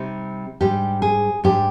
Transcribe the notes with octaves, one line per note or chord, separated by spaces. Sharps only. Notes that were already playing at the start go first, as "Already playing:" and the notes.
Already playing: C3 G3 C4 D#4
G#2 G3 D4 G4
G#4
G#2 G3 D4 G4